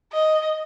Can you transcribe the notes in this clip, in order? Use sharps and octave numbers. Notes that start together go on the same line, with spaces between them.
D#5